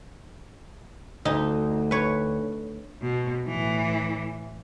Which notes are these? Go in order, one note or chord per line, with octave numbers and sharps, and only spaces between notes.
D2 D#4
B4 C#5
B2
A2 E3